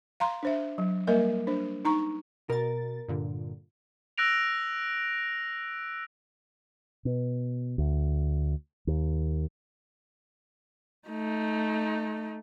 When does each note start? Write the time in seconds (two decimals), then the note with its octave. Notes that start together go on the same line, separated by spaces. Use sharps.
0.20 F5 A#5 C6
0.43 D4 C5 E5
0.78 F#3
1.07 G3 A#3 A#4 D#5 E5
1.47 D4 C5
1.85 D#4 A#5 C#6
2.50 B2 A#4 A6
3.08 G2 A#2 D3
4.18 E6 F#6 A#6 D7 F7
7.05 B2
7.78 D2
8.87 D#2
11.08 A3 D#4